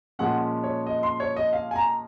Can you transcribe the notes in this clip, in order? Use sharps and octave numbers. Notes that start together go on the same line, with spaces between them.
A#2 F3 G#3 C#4 F#5
C#5
D#5
C6
C#5
D#5
F5
G#5
A#5